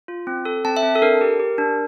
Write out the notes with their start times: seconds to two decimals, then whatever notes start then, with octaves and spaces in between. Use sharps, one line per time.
0.08 F4
0.27 C4
0.45 A4
0.65 C4 A5
0.77 E5
0.83 C4
0.95 A4
1.02 D4 A#4
1.21 G4
1.40 G4
1.58 D4